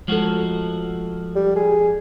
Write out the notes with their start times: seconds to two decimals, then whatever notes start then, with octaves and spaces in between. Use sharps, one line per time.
0.08 F3 G#3 F#4 A4
1.36 G3
1.56 G#4